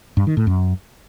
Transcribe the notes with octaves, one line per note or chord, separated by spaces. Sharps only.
G2
D#3
A2
F#2